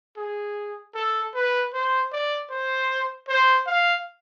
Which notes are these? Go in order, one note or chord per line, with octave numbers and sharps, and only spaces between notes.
G#4
A4
B4
C5
D5
C5
C5
F5